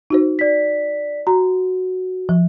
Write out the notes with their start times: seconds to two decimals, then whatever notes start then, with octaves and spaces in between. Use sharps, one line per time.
0.10 D#4 F#4 C5
0.39 D5 B6
1.27 F#4 A#5
2.29 F3